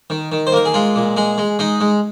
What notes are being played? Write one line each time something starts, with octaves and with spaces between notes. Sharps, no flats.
D#3
D#3
C5
A#3 A#4
G#4
G#3 F4
A#2
G#3 G#4
G#3
G#3 D#4
G#3